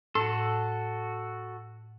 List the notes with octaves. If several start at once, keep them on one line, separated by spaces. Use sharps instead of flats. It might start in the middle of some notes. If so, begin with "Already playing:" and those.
A2 F#4 A4